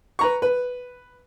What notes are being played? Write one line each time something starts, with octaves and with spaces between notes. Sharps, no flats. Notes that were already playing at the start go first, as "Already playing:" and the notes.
B4 A#5 C#6
B4